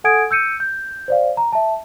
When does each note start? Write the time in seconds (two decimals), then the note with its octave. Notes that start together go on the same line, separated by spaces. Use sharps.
0.04 A4 F#5 G#5 D#6 G#6 D7
0.31 E6 G6 C#7 D#7
0.60 G6
1.08 C5 D5 F5
1.37 A#5
1.53 E5 A5